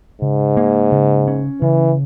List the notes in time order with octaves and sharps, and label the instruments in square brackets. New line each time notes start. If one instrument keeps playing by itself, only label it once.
[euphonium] G#2 [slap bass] C#3
[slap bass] A#3
C#3
C#4
[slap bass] C#3 [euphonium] E3